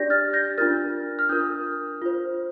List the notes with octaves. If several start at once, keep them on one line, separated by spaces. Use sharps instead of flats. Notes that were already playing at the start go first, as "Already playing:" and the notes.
Already playing: D4 G4 D5 G6 A#6
F6 A6
G6 A#6
D4 F4 A#4 F6 A6
F6
D4 F4 A#4 D#6 G6
F4 C5